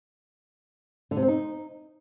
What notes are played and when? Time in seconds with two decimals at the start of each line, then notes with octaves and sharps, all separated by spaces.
1.11 D3
1.17 C3
1.22 C4
1.28 D#4